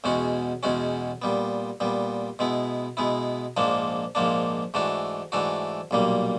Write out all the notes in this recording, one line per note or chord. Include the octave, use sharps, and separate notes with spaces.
E2 B2 G#3 C#4 F#4
E2 B2 G#3 C#4 F#4
A#2 G3 B3
A#2 G3 B3
B2 G#3 B3 E4
B2 G#3 B3 E4
A#1 G#2 F3 A#3 D4
A#1 G#2 F3 A#3 D4
G#2 E3 A3 D4 F#4
G#2 E3 A3 D4 F#4
B1 A#2 G3 A#3